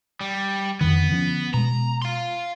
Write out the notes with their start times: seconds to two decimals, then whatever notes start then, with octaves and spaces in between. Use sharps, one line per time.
0.21 G3
0.81 F2 D3 D#3 B3
1.10 D3 F3 C#4
1.54 B2 G#3 A#5
2.02 F5 C6